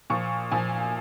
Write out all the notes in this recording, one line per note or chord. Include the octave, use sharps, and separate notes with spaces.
A#2 F3 C#6
A#2 F3 G#5